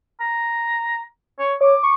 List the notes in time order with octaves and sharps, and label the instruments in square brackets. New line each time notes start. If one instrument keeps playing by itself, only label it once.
[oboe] A#5
C#5
[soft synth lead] C#5 [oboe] D6
[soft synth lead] C#6